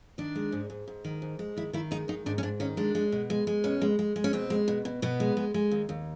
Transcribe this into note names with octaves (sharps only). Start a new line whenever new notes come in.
D#3 D4
G#3
G#2
G#2
G#2
D#3
G#2
G#3
D#3 E4
D#3 E4
G#3 D#4
D#3 D#4
G#2 D4
C#4
G#2 D4
D#3 C#4
G#3 D4
G#3
B2
G#3
G#3
B2 C#4
G#3
G#3
G#3
C#4
B2 C4
G#3
B2
B2
B2 B3
G#3
G#3
G#3
D#2
D#2